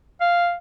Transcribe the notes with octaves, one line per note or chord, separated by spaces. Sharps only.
F5